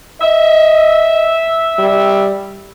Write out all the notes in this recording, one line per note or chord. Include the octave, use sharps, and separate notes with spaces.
D#5 E5
G3